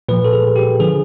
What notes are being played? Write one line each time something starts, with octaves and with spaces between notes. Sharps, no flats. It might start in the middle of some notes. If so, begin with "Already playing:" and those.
A#2 F3 B4
A4
G#4
G4
D3 F3 G#4